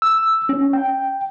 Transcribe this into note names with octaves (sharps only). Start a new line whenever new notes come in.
E6
C#4
G5